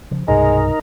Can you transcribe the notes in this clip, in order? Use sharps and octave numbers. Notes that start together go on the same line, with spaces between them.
C#3 F3
C2 G2 B2 G#3 D#4 A#4